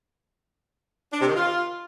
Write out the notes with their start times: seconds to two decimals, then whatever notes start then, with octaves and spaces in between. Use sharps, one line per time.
1.13 D4
1.20 C3
1.28 D#3
1.35 F4